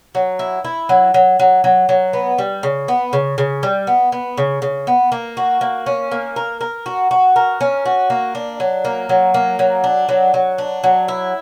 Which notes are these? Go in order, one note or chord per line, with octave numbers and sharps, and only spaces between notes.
F#3
E4
E4
F#3
F#3
F#3
F#3
F#3
B3
G3
C#3
B3
C#3
C#3
G3
B3
B3
C#3
C#3
B3
A#3
F#4
A#3
C#4
A#3
A#4
A#4
F#4
F#4
A#4
C#4
F#4
A#3
D4
F#3
A#3
F#3
A#3
F#3
D4
F#3
F#3
D4
F#3
E4